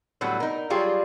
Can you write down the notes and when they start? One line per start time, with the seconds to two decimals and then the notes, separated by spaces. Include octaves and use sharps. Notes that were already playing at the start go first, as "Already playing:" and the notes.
0.21 A2 D3 F#3 G3 B3
0.40 D#4 A#4
0.70 F#3 G3 F4 G4 G#4